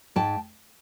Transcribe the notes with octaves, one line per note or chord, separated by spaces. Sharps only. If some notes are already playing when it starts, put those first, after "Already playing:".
G#2 G5 A5